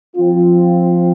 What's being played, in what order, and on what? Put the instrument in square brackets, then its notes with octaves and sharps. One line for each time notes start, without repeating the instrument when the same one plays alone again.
[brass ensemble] F3 C4 F4